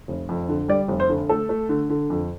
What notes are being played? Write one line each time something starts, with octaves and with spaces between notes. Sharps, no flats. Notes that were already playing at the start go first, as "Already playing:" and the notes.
F1
F2
D3
G3 D5
F1
C5
D3
A3 A4
A3
D3
D3
F2